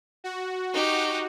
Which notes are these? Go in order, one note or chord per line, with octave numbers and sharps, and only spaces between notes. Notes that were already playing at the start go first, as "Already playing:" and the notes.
F#4
D#4 G4